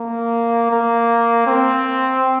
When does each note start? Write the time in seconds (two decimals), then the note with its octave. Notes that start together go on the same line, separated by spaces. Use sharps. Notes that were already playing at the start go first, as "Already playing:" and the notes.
Already playing: A#3
0.71 A#3
1.47 C4